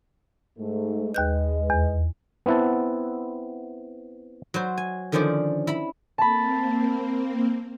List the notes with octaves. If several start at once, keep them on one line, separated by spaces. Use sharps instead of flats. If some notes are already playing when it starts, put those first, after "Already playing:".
G#2 A3
D#2 G#3 B4 D#5 F#6 G6
E2
B3 C4 E4 F#5 A5
F#3 F#4 C5
G#5
D3 D#3 F3 C#4 C5 D5
E4 B5
A#3 C4 A5 B5